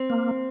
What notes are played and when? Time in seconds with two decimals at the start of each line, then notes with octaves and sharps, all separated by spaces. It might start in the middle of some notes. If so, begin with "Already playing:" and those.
Already playing: C4
0.10 A#3